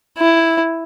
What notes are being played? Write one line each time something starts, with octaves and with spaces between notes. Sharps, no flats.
E4